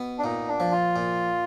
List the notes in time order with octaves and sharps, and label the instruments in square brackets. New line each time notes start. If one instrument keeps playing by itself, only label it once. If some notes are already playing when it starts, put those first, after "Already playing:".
Already playing: [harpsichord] B2 B3
[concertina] D4
[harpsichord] A#2 [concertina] D#4
[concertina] D4
[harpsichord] F3
[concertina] F4
[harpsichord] A#2